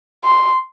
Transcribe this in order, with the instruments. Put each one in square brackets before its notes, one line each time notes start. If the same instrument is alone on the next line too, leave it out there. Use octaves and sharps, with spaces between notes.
[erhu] C6